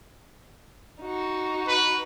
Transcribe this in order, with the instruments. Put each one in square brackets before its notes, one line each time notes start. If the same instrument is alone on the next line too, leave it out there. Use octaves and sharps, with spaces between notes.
[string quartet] D#4 F#4
[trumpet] B4